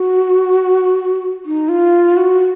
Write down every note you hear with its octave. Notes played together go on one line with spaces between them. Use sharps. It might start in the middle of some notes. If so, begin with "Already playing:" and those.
Already playing: F#4
D#4
F4
F#4